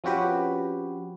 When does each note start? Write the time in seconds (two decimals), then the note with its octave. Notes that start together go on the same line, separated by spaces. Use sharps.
0.04 F3 C4 C#4 F#4 G4 B4